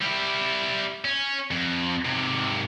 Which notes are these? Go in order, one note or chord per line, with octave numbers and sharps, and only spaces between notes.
G3 E4
C#4
F2
G#2 C3